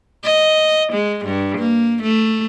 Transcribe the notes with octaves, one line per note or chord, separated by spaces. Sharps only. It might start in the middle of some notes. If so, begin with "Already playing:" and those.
D#5
G#3
G2
A#3
A3